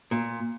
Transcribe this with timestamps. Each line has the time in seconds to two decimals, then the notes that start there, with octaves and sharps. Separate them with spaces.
0.11 A#2